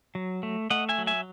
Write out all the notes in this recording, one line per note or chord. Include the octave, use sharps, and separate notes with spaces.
F#3
A3
A3 D#5 F#5
E5 G#5
F#3
E5 G#5